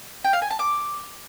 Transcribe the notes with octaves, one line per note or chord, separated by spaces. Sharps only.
G5
F5
G#5
A5
D6